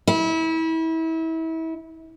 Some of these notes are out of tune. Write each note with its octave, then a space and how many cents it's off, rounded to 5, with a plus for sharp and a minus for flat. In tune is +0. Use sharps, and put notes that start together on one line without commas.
E4 -30